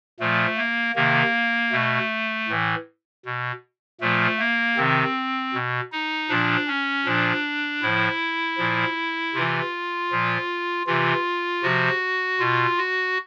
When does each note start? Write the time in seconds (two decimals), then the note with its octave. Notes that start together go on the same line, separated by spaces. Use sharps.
0.20 A#2 F3 A3
0.57 A#3
0.95 C3 D#3 A#3
1.72 B2 A3
2.49 A2 E3
3.25 B2
4.01 A#2 F3 A3
4.39 A#3
4.77 C3 D#3 C4
5.54 B2
5.92 D#4
6.29 A#2 F3 D4
6.68 C#4
7.06 A#2 F3 D4
7.82 A2 F3 E4
8.58 A#2 F3
9.34 C3 E3 F4
10.11 A#2 F3
10.87 C3 E3 F4
11.63 C3 F3 F#4
12.40 B2 F4
12.78 F#4